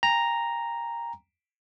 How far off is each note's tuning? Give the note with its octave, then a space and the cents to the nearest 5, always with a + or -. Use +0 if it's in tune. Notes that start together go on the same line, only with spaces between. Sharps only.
G5 +35 A#5 +0